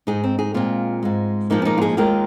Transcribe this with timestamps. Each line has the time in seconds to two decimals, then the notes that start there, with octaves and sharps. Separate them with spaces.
0.07 G#2 G#3 D#4 G#4
0.24 C4
0.39 D#4 G#4
0.54 A#2 G#3 C4 F4
1.03 G#2 G#3
1.50 A#2 F3 G#3 A#3 D#4
1.62 C4
1.65 A#3 D#4
1.78 F4
1.82 D#4 G#4
1.97 D#2 D#3 G#3 F4 A#4